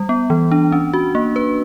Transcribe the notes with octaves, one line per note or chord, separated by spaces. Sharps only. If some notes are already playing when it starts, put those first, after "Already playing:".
Already playing: G3
B3
E3
D4
C#4
F#4
A#3
B4